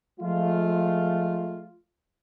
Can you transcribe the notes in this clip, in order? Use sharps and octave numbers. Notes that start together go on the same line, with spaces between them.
F3 G#3 A3 F4